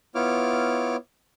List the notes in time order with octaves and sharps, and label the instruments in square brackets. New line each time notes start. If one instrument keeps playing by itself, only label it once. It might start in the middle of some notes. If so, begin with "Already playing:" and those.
[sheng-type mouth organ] B3 E4 F4 C#5 D6 F6